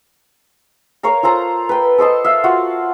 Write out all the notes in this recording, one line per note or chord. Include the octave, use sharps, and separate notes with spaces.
A#4 C#5 F5 A#5
F4 A4 C5 A#5
B4 G5
A4 C5 D#5 A5
E5 F5
F4 F#4 F#5